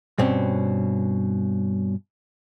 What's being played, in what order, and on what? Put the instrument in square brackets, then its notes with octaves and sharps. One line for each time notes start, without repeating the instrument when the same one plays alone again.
[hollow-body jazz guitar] G2 B2 C4 C#4